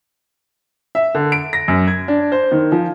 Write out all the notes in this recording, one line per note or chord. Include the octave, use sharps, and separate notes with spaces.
E5
D3
D7
A#6
F#2
G#6
D4
C5
D#3
F3